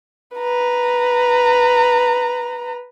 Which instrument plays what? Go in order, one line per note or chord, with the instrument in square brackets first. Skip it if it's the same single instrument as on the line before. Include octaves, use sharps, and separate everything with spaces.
[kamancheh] B4 A#5